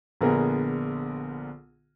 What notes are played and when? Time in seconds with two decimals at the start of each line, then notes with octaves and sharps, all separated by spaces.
0.21 A#1 D3 B3 G#4 A#4